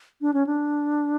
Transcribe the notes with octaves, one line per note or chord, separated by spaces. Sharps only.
D4
C#4
D4